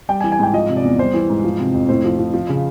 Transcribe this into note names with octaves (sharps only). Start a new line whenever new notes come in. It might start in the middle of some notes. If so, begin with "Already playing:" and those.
G3 G5
G#5
E3
G#5
G#2 G5
F3 D#5
C3
D5
E2
G3 C5
E3
G#2
F3
C3
F2
A2 C5
F3
F3
F3
C#3